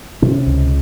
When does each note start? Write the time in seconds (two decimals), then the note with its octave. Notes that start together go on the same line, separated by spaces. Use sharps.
0.22 C3 C#4
0.46 C#2